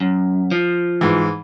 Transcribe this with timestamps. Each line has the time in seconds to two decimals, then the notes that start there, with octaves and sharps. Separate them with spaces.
0.01 F#2
0.51 F3
1.01 G#2 E3